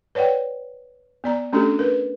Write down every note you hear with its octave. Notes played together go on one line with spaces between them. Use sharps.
B4 C#5 D5 F#5 G5
B3 D5 A#5
A3 C#4 D4 F#4 G4 A4
A#4 B4